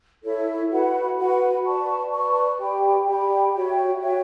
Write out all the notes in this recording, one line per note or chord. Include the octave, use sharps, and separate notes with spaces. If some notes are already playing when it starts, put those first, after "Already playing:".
E4 A4 C#5 E5
F#4 B4 F#5 B5
F#4 B4 F#5 B5
B4 D5 A5 C#6
B4 D5 A5 C#6
G4 D5 G5 B5
G4 D5 G5 B5
F#4 C#5 E5 G5
F#4 C#5 E5 G5